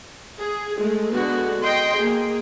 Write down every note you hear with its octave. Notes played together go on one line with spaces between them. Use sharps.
G#4
G#3 A3
D3 G#3 B3 F#4
D#5 G5 C6
A#3 G#4